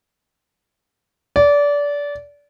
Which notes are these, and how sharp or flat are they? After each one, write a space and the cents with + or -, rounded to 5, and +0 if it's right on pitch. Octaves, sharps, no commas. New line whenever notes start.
D5 -25